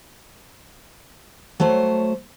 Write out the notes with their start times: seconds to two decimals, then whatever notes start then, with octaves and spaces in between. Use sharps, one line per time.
1.60 F#3 A3 C5 C#5